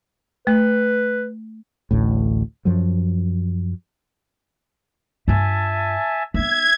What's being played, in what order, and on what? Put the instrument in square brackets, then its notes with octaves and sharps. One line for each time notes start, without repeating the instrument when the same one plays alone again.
[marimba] A3 [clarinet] B4
[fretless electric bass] A1 D2 A2
F#2 F3 F#3
[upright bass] G2 F4 [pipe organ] E5 G#5 A5
[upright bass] B3 D#4 [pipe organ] E5 [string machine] G#6